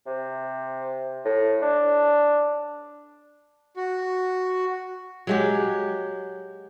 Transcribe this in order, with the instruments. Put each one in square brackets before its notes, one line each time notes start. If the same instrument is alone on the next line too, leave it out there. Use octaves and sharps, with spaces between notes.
[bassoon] C3
A2
D4
[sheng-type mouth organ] F#4
[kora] F#3 G#3 G4